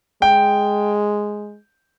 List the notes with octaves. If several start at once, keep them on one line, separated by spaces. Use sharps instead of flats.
G#3 G5